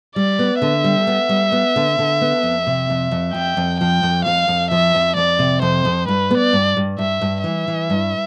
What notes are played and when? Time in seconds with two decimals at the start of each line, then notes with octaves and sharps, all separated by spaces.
0.16 G3 D5
0.39 B3
0.62 D3 E5
0.84 G3
1.07 B3
1.29 G3
1.52 B3
1.76 D3
1.99 D3
2.21 B3
2.43 F2
2.67 C3
2.90 F2
3.11 F2
3.34 F2 G5
3.57 F2
3.80 F3 G5
4.03 F2
4.26 F2 F5
4.48 F2
4.71 F3 E5
4.95 F2
5.17 F2 D5
5.39 C3
5.62 F2 C5
5.85 F2
6.08 G2 B4
6.31 B3
6.38 D5
6.53 G2
6.77 G2
6.99 G2 E5
7.21 G2
7.44 E3 E5
7.68 E3
7.90 G2